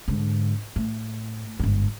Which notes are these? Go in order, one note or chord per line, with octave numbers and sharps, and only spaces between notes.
G#2 D3
A2
G1 G#2